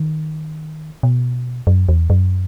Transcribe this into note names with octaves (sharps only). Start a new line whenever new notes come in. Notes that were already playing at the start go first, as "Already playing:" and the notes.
Already playing: D#3
B2
F#2
E2
F#2